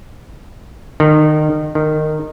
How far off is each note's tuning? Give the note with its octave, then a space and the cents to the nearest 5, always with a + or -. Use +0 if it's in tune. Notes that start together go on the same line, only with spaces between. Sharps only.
D#3 -30
D#3 -20